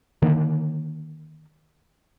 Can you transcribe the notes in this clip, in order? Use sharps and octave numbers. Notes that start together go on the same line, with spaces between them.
D3 D#3 A#3